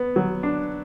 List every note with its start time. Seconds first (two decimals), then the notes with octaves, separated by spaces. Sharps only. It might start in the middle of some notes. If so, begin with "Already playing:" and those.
Already playing: B3
0.16 F#3
0.43 D4